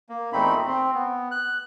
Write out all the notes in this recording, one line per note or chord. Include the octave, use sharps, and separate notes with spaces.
A#3
E2 A#2 A3 C4 D#4 B5
C4
B3
F#6